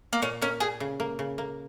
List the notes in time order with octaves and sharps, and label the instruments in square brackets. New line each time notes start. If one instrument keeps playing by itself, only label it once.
[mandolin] A#3
[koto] A#2 [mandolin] C#4
[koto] A#3 [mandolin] C#4
[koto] A#2 [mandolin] G#4
[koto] C#3
A#3
C#3
A#3